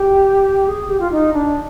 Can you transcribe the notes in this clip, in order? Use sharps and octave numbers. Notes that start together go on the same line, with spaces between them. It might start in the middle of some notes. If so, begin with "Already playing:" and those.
Already playing: G4
G#4
G4
F4
D#4
D4